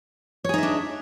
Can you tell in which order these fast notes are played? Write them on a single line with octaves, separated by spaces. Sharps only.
C#5 G#4 D#4 E5 D4